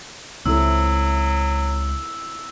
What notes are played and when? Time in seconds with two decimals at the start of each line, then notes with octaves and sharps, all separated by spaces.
0.45 C#2 F#3 C4 E4 A4 E6